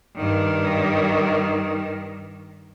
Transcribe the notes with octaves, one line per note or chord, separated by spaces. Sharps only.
G2 D#3